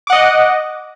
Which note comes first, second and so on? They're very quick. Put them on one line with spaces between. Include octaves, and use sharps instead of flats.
D6 F#5 D#5